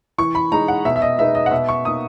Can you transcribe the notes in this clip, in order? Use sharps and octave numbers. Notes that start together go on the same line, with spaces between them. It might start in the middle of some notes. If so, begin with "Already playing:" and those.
E3 C#6
B5
G#3 D#4 A#5
F#5
B2 E5
E5
D#5
G#3 B3 D#4 E5
D#5
F#5
B2 E5
C#6
A#3 D#4 D#6